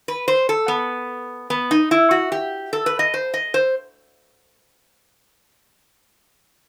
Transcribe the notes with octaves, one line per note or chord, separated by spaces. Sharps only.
B4
C5
A4
B3
B3
D#4
E4
F#4
G4
A4
B4
D#5
C5
D#5
C5